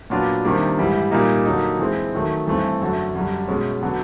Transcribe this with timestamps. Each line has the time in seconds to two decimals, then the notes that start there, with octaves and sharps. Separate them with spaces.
0.10 A#2 F#3 B3 D4 F4
0.44 C3 D#3 G3 A#3 D4
0.79 G#2 E3 G3
1.11 A#2 G3 A#3 D#4
1.45 D3 F#3 A#3 D#4
1.79 E3 G#3 C4
2.14 D#3 F#3 A3
2.47 G2 E3 A3 C4
2.81 F#2 D3 F#3 A3
3.15 F#2 D3 G3
3.48 B2 G#3 C#4
3.82 D3 F#3 B3